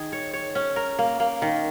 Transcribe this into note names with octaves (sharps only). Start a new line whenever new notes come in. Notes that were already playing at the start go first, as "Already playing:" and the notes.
Already playing: D#3 G#4
C#5
C#5
C#4
A#4
A#3
A#3
D#3